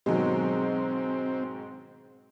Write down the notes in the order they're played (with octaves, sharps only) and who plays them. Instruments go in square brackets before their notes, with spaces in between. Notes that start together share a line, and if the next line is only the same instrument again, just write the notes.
[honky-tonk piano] G#2 G#3 [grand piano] B2 D#3 F#3 [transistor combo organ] C4